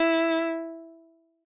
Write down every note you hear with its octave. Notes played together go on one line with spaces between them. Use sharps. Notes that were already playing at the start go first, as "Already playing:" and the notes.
Already playing: E4